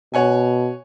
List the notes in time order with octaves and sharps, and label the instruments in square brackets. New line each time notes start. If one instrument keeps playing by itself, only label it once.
[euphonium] B2 [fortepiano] C#5 F#5 G#5